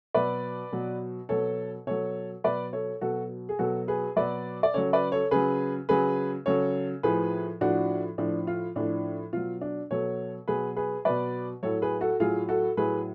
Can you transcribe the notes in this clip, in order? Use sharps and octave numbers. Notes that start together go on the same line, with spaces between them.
B2 F#3 B4 D5
B2 F#3
B2 F#3 A4 C#5
B2 F#3 A4 C#5
B2 F#3 B4 D5
A4 C#5
B2 F#3 F#4 A4
G#4
B2 F#3 F#4 A4
G#4 B4
B2 F#3 B4 D5
D5
C#3 F#3 A4 C#5
B4 D5
A4 C#5
C#3 F#3 G#4 B4
C#3 F#3 G#4 B4
C#3 F#3 A4 C#5
A2 F3 G#4 B4
A2 F3 D4 F#4
A2 F3 D4
F4
A2 F3 D4
B2 F#3 F4
D4
B2 F#3 A4 C#5
B2 F#3 G#4 B4
G#4 B4
B2 F#3 B4 D5
A2 F#3 A4 C#5
G#4 B4
F#4 A4
A2 F#3 F4 G#4
F#4 A4
A2 F#3 G#4 B4